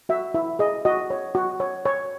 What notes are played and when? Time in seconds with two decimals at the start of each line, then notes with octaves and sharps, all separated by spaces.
0.09 F#4 E5
0.34 E4 E5
0.59 G#4 D#5
0.85 F#4 D#5
1.10 C#5
1.35 F#4
1.60 C#5
1.85 C#5